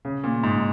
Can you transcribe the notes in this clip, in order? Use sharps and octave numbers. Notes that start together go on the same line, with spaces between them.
C#3
A#2
G#2